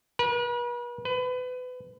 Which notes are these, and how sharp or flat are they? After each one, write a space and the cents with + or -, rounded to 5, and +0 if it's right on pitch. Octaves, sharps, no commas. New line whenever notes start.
B4 -40
B4 +30